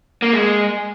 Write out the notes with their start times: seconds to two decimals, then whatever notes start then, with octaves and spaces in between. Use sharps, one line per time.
0.22 A#3
0.33 G#3